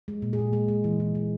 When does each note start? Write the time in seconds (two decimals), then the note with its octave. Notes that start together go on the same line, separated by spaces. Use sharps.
0.08 G#3
0.22 A#2
0.33 G#4
0.39 A#2
0.53 G#3
0.68 G#3
0.84 E3
1.00 E3
1.15 G#3